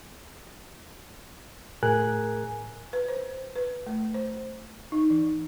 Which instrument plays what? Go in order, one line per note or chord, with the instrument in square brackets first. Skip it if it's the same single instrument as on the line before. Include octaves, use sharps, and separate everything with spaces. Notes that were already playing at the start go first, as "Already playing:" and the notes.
[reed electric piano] A2 G#4 A#4 G#5 F#6
[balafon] B4
C5
B4
A3
C5
D#4
E3